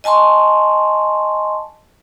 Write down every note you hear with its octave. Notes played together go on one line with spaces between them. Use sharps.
D#5 G#5 A5 C6 C#6